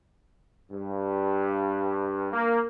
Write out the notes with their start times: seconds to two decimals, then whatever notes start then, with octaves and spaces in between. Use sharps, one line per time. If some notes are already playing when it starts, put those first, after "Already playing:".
0.71 G2
2.33 A#3